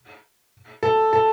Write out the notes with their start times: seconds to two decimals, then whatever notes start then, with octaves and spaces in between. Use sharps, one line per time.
0.83 A4
1.13 A4